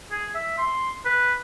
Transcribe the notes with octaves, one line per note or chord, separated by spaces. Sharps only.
G#4
E5
C6
B4